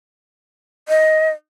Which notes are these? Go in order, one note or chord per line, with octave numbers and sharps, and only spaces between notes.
D#5